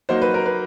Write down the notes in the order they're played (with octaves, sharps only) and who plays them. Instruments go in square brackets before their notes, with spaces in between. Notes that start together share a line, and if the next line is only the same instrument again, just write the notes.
[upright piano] F#3 A#3 D#4 C5
B4
A#4
B4